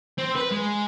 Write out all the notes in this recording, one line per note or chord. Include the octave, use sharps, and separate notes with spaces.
C4
B4
G#3